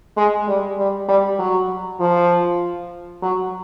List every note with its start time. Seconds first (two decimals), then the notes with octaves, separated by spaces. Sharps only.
0.17 G#3
0.47 G3
0.78 G3
1.08 G3
1.39 F#3
2.00 F3
3.22 F#3